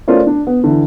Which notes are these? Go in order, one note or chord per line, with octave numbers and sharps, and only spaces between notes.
A3 C#4 F4 A#4 C5 D5
D4
B3
D3 E3